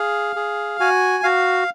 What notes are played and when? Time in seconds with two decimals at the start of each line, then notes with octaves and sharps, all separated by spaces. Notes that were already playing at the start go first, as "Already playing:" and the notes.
Already playing: G#4 F5
0.36 G#4
0.80 F#4 G#5
1.24 F#4 F5